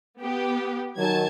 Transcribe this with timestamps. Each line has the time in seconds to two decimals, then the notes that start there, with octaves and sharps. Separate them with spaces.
0.21 B3 G4
0.97 D#3 F#3 G#5 A5 G#6